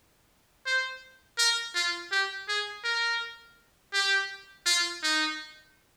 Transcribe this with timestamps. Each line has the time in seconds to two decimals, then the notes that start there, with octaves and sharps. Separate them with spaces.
0.66 C5
1.38 A#4
1.75 F4
2.12 G4
2.48 G#4
2.84 A#4
3.93 G4
4.66 F4
5.03 D#4